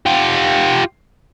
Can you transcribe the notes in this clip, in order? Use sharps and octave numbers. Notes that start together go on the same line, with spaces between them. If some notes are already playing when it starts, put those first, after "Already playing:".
F4 G4